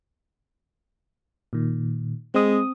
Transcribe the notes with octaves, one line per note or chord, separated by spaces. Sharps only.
A#2 D#3
G#3 C4 D#6